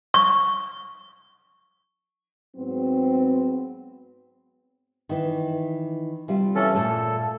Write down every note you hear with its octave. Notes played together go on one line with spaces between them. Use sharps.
C#6
G#2 F#3 B3 C4
D#3 E3
C3 G3 F4
E3 C#4 A4
A#2 A3 A4